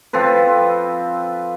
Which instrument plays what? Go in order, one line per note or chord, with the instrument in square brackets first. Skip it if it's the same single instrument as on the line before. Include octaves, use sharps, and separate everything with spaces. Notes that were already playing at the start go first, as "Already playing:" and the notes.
[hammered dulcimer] F3 C4 A4 B4